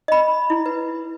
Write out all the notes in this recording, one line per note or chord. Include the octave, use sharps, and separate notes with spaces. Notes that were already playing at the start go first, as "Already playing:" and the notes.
D#5 B5
E4
B4